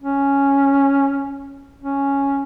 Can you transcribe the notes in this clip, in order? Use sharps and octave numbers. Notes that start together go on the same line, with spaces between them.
C#4
C#4